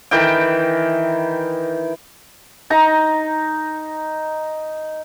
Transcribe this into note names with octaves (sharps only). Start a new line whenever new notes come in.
D#3 E3 G5
D#4 A#5